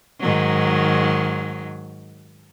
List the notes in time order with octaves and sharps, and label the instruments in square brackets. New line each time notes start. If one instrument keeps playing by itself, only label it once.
[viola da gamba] G#2 D#3 F#3